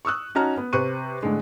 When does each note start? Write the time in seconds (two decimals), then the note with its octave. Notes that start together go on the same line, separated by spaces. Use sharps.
0.05 C#6 D#6 E6 F#6
0.35 C#4 D#4 F#4 A5 A#5 F6
0.58 B3
0.73 C3 B4 C5 C#6 F#6 D#7
1.23 A2 D3 G#3